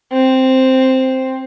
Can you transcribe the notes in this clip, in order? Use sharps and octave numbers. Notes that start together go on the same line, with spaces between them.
C4